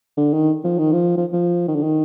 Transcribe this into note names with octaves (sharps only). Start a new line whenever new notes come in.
D3
D#3
F3
D#3
F3
F3
F3
D#3
D3
D#3